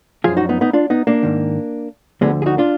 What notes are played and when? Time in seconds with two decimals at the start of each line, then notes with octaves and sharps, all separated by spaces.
0.24 F#2 F3 F4 G#4
0.37 D#4 F#4
0.49 B3 D#4
0.61 B3 D#4
0.73 D4 F4
0.90 B3 D#4
1.07 A#3 D4
1.23 G#2 D#3
2.21 D2 D3 F3 G#3 B3
2.42 G#4
2.46 D#4 F#4
2.58 D4 F4